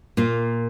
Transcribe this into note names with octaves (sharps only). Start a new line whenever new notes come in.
A#2 A#3 F4